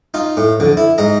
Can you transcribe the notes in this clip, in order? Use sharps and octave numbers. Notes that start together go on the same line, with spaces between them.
D#4 F4
A2
F2 D3
E4
G#2 D#5 A#5